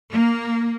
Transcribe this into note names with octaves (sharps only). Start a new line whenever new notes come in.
A#3